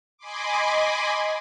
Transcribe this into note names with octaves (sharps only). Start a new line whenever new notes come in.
D#5 G#5 B5 C6 D6